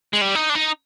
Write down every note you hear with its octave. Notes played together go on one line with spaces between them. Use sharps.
G#3
G3
D#4
D4
D#4